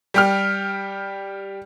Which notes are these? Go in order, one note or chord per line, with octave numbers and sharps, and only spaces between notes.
G3 G4 F6